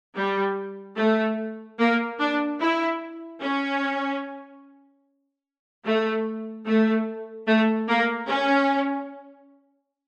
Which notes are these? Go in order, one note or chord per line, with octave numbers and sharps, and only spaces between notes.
G3
A3
A#3
D4
E4
C#4
A3
A3
A3
A#3
C#4